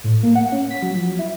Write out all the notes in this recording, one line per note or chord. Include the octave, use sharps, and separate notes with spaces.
A2
A#3
F#5
C#4
B6
F#3
F3
F#3
E4